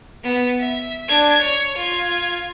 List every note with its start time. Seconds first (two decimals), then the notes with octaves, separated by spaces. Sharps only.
0.24 B3
0.60 E5
1.08 D4 G#6
1.41 C#5
1.78 F4 G#6